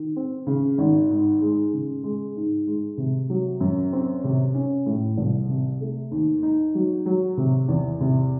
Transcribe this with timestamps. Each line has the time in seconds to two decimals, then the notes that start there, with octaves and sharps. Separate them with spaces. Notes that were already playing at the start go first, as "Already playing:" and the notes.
Already playing: D#3
0.16 C4
0.47 C#3
0.78 G#1
1.10 G#2
1.41 G#3
1.73 C#3
2.03 G#3
2.36 G#2
2.67 G#3
2.98 C3
3.30 F#3
3.60 F#2
3.93 C4
4.24 C3
4.55 C#4
4.86 A2
5.17 C2
5.49 C3
5.81 A3
6.11 D#2
6.43 D#4
6.75 F#3
7.06 F#3
7.37 C3
7.68 E2
8.00 C3